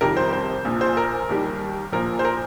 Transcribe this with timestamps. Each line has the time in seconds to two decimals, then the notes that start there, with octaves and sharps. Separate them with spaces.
0.01 F2 C3 D#3 G3 A#4
0.17 C5
0.33 C5
0.65 A#1 A#2 F3
0.81 C5
0.97 A#4
1.29 D#2 D#3 G3
1.92 A#1 A#2 F3 A#4
2.19 C5
2.25 A#4